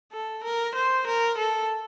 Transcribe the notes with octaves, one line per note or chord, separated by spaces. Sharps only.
A4
A#4
C5
A#4
A4